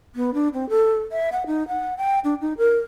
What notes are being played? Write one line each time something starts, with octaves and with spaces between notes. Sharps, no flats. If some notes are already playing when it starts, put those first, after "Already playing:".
B3
D4
C4
A4
E5
F#5
D#4
F#5
G5
D4
D#4
A#4